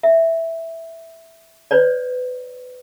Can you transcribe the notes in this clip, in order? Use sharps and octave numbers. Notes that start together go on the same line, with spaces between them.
E5
B4 C#5 D5